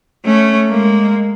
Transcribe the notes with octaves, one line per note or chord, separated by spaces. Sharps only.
A3 C#4
G#3 A#3